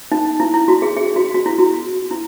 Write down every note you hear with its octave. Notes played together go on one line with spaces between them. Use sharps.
D#4
E4
E4
F#4
G#4
G#4
F#4
F#4
E4
F#4
E4